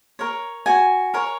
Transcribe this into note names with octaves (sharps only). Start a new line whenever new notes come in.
A#4 C#5
F#4 G#5
A#4 C#5